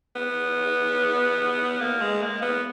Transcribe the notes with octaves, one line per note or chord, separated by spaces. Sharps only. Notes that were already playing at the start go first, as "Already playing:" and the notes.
B3
A#3
G#3
A#3
B3